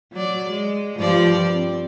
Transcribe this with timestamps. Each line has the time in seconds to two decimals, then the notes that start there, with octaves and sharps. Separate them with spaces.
0.12 F#3 D5
0.50 G#3
0.97 G2 F3 D5
1.51 C4